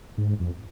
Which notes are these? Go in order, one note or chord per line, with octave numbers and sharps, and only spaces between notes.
G#2
F2